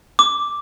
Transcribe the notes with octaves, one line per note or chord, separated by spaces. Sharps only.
D6